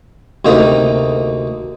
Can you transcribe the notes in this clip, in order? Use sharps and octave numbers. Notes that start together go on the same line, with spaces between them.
D2 C3 A#3 D#4 G5 A#5